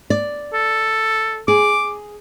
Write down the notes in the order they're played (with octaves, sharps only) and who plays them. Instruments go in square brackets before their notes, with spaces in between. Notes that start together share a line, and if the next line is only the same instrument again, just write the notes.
[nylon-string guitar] D5
[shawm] A4
[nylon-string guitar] G#4 [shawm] D6